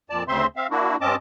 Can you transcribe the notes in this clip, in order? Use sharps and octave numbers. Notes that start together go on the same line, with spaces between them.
F2 A#2 D5 A5
D2 C#3 C4 C5 E5 C6
C4 E5 F5
A#3 D4 E4 F#4
G2 C4 C#4 D#5 A5 D6